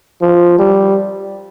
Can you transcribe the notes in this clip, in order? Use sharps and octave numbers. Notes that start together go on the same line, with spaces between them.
F3
G3